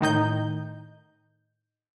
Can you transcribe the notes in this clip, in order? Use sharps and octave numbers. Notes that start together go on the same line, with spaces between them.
A2 D#3 D#4 G6